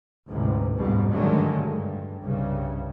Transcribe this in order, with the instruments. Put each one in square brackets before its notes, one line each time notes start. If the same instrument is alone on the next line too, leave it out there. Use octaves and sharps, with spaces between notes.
[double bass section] A1 D2 G#2 C3
A1 F2 G#2 B2 G3
G2 D3 D#3 F#3 G#3 A3
G2
C2 G2 C#3